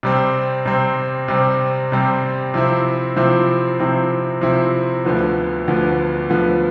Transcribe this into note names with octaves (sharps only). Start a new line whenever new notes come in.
C3 G3 C4
C3 G3 C4
C3 G3 C4
C3 G3 C4
C3 F3 C4 E4
C3 F3 C4 E4
C3 F3 C4 E4
C3 F3 C4 E4
D2 D3 F3 B3
D2 D3 F3 B3
D2 D3 F3 B3